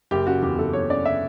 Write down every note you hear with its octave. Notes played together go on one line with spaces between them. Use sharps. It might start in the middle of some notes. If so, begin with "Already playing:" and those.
F#1 G4
C#3 F#4
E2 G4
F#1 A4
F#1 C#5
C#3 D5
E5